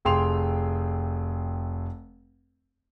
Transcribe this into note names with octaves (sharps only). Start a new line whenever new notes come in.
F1 G#4 G5 C6 F7